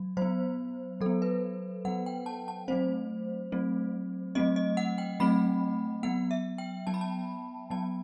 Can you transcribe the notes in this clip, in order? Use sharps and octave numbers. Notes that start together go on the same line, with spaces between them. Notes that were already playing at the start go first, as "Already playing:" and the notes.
Already playing: F#3
F#3 B3 C5
F#3 A4
B3
B4
F#3 B3 F#5
G5
A5
A5
F#3 A3 C4 C5
F#3 A3 C4
F#3 A3 C4 D#5
D#5
F#5
G5
F#3 A3 C4 B5
F#3 B3 F#5
E5
G5
F#3 B3 A5
B5
A5
F#3 B3 A5